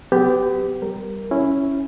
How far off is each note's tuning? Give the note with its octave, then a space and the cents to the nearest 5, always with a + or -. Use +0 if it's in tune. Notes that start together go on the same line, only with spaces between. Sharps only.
F#3 +30 B3 +35 G4 +0
G3 -10 A#4 +0
C#4 +0 E4 +0